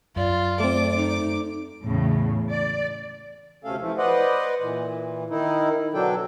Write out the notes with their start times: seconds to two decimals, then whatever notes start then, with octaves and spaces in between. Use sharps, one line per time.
0.16 F#2 F4 D5
0.60 A3 C4 D6
0.96 D#4
1.84 E2 A2 C#3
2.50 D5
3.64 D2 C3 A3 C#4 A4 F5
3.80 E3 F3 A3
3.98 B4 C5 D5 D#5 F#5
4.60 A#2 E3
5.30 D#3 D#4 E4
5.94 B2 D3 F#3 D4 A4 G5